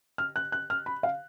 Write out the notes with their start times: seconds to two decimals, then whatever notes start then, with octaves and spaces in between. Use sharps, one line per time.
0.18 F6
0.36 F#6
0.52 F#6
0.70 F6
0.86 B5
1.03 F5